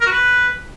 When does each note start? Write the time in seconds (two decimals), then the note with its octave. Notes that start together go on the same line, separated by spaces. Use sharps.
0.01 A#4
0.06 F#4
0.12 B4